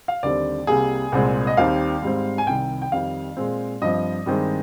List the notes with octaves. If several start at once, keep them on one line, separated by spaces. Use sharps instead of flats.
F5
D#2 D3 G3 C4 D5
C2 C3 G3 A#3 G#4
C2 A#2 G#3 C4
D#5
D#2 D#3 G3 C4 F5
G#2 G3 C4
G#5
C2 C3 D#3 G3 G5
G5
F2 D#3 G3 C4 F5
A#2 G#3 C4
G2 F3 C4 D#5
G2 D#3 G#3 C4